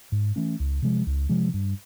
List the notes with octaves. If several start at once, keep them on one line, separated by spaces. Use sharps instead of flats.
G#2
E3 A3 C#4
C#2
C3 F3 G#3
C#2
C3 F3 G#3
G2